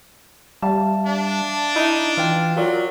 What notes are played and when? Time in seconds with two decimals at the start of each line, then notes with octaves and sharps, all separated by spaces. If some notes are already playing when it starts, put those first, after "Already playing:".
0.62 G3 E5 F5 A5
1.06 D4
1.76 D#4 E4
2.17 E3 F4 G5
2.57 F#3 F4 A#4 D5